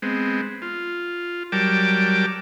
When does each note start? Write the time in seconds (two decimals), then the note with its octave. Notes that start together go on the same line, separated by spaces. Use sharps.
0.02 G#3 B3 C4
0.62 F4
1.52 F#3 G3 A#4 G5 A5 D6